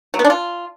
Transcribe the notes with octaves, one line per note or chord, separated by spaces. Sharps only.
F#3
B3
D4
F4